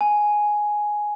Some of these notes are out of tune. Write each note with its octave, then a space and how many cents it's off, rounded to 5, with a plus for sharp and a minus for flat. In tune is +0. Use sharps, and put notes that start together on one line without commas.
G#5 +5